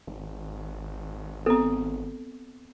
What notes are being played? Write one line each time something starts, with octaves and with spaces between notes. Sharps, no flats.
G#1
B3 C4 A4